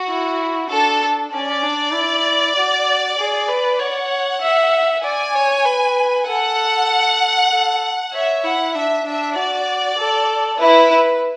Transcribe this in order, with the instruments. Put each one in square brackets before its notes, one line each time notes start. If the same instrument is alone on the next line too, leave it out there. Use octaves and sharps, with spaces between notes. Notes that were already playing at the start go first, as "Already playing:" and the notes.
Already playing: [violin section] F#4
[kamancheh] E4
[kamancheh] D4 [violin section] A4
[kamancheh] C#4 [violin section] D5
[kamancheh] D4
E4
F#4
G#4
B4
[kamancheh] C#5 [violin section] F#5
[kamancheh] E5
[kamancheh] D5 [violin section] G#5
[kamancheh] C#5
B4
[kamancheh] A4 [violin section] F#5
[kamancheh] A4
[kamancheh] C#5 [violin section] E5
[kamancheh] E4 [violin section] F#5
[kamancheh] D4 [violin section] E5
[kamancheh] D4 [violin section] E5
[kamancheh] F#4 [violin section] D5
[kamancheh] A4
[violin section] E4 [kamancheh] B4
[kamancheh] B4